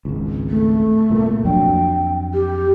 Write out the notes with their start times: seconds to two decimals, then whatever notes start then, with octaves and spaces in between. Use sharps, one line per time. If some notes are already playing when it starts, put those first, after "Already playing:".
0.05 G#1 C#2
0.50 A3
1.10 C2 A#2
1.45 F2 F#3 D4 G5
2.34 G4